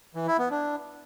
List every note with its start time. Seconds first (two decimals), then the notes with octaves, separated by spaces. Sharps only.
0.15 E3
0.27 E4
0.39 B3
0.51 D4